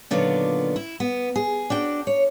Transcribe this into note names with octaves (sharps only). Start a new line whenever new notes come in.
A#2 D3 D#3 F#3 B3 F4
E4
B3
G#4
D4 F#4 G5
C#5